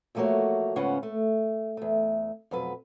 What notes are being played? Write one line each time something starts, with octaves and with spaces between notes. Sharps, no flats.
E2 F3 A3 A#3 F#4 C#5
G#2 C#3 B3 C#4 F4 F#5
A3
E2 A3
F2 B2 F#3 B4